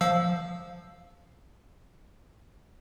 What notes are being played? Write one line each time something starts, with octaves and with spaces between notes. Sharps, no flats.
F3 F5 E6